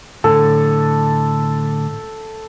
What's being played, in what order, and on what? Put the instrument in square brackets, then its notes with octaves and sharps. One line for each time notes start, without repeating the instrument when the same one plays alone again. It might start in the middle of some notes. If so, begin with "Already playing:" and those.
[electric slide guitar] A2 D3 [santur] A4